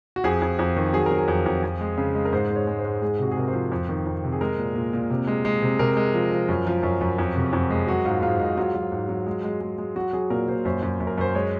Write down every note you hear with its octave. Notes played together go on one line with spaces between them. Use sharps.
F#4
F2 G#4
F2
F2
D#3
F#3 G#4
F#3 A#4
G#4
F2
F2
F2
G#3
C#3
G#3
A#4
G#2 C5
G#2
C#5
G#3
C5
G#2
G#3 G#4
C3 F#4
G#4
C3 A#4
C5
F3
F2
D#3
F2
C3
G#4
G#3 A#4
A#2
A#2
A#2
C3
G#3
G#3
C3
C3 A#4
G#3
F3
F3
F#2
F3
F#2
F#2
F2
C3
F2
G#3
F#3 F#4
G#2 F4
G#2 F4
G#2 D#4
F#3 F4
F#3
G#2
F#3
G#3
G#3
G#3
G#3
F#3 F#4
F#3 G#4
A#2 A#4
A#2 C5
F#2 C5
F#2
F#2
A#4
F#2 C5
G#3 C#5